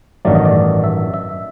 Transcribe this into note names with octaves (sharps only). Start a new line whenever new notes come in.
A1 G2 D#3 F#3 A3 D5
D#5
D5
E5
E5